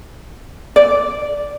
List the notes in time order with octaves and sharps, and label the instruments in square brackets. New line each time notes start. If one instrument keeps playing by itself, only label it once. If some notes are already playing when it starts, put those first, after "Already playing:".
[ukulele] D5